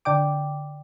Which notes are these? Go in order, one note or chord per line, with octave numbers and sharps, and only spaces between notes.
D3 D5 G5 D6